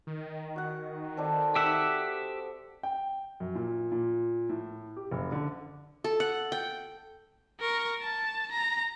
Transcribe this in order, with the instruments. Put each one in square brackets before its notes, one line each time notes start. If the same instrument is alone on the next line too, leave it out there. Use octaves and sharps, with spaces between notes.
[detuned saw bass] D#3
[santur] F#4 F#5
C4 A4 D5
[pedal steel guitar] G4 E5 F#5 [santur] C5 D#6
[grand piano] G5
F#2
A#2
A#2
A2
G4
F#1
D3
[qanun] A4
F#5
G5
[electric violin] A#4 C#6
A5
A#5